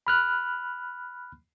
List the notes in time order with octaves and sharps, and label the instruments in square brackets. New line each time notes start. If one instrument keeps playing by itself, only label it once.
[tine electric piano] B5 F6 F#6